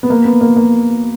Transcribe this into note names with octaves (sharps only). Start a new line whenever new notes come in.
B3
A#3
B3
A#3
A#3